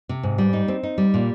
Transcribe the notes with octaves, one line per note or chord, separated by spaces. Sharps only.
C3
G#2
G3
D#4
C4
D#4
G3
A#2